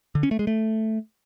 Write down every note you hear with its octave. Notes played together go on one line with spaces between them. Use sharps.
D3
C#4
A3
G#3
A3